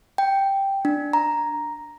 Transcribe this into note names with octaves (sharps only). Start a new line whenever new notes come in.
G5
D4
A#5